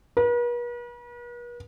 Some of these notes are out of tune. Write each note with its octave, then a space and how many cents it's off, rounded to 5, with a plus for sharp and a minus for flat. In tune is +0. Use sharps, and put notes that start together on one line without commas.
B4 -45